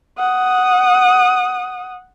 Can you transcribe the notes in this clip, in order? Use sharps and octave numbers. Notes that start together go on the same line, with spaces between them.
F#5 D#6